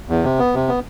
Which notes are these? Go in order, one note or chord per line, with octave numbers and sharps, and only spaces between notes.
E2
C3
B3
C3
B3